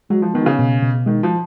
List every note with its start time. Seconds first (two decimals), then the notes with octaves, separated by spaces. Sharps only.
0.10 F#3 G#3
0.22 F3
0.34 D#3 B3
0.41 B2
0.46 C#3
0.59 B2
0.82 B2
1.06 D#3 G#3
1.23 F3